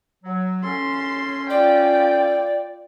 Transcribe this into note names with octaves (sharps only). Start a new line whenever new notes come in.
F#3
C#4 A4 C6
F4 D5 G5